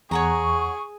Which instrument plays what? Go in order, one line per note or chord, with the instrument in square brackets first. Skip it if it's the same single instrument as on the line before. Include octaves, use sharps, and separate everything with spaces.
[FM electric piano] E2 [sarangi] G#4 [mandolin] C#5 F#5 A#5 [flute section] C#6